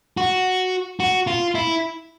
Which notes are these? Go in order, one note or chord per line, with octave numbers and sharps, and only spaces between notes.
F#4
F#4
F4
E4